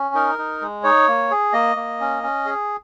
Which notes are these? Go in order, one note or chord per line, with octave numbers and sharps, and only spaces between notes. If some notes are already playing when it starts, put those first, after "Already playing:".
Already playing: C#4
D#4 A#4
D#4
G#3
D#4 C#5
A#3
G#4
A#3 D#5
A#3
C#4
C#4
G#4